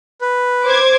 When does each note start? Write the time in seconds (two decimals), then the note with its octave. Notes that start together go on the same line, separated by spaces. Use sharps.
0.21 B4
0.64 C5 D6 G#6